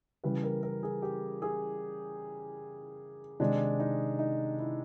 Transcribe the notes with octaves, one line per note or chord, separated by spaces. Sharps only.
C#3 E3 G3 B4
A#4
A#4
G#4
G4
G#4
C3 D#3 G#3 D4
D#4
D#4
E4